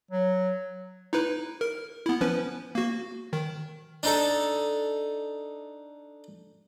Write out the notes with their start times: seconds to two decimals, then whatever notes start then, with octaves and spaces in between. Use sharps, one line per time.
0.11 F#3
1.13 D#4 E4 B4
1.61 A#4
2.06 B3 E4
2.21 F3 C#4 B4
2.75 A#3 F#4
3.33 D#3
4.03 D4 D#4 A4